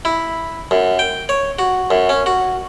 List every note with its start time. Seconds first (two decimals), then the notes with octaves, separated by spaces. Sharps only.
0.05 E4
0.71 F#2
0.99 G5
1.29 C#5
1.59 F#4
1.91 F#2
2.09 C#4
2.26 F#4